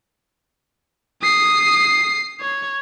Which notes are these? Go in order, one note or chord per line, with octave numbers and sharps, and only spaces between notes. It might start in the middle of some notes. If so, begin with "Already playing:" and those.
D#6 C7
C#5